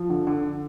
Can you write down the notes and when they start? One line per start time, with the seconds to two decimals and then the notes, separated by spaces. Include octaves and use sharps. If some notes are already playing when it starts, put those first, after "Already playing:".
Already playing: F3
0.10 D3
0.27 D3